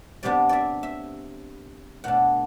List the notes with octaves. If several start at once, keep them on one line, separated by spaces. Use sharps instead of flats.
C3 G3 B3 D4 D5
D5 E5
E5
B2 A3 D4 F#5